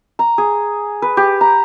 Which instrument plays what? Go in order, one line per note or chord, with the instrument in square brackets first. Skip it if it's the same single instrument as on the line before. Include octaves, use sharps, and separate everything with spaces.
[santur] A#5
G#4
B4
G4
A#5